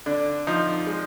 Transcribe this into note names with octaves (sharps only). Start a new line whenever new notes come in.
D3 D4
F3 D#4
G#3